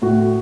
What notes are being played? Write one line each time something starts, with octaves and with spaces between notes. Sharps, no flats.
A2 F#4